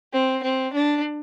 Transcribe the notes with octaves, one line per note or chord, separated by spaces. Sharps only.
C4
C4
D4